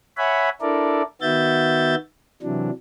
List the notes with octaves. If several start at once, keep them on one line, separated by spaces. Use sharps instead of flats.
C#5 E5 F#5 G#5 B5
D4 E4 A4 A#4 D5
D#3 B3 F#4 E5 G6 A6
C3 E3 F#3 D4